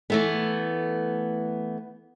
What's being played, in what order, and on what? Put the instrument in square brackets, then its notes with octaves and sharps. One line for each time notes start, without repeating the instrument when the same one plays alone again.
[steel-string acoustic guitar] E3 A3 B3